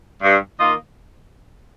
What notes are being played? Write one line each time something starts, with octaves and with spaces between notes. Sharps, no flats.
G2
D#3 A#3 F4 D#5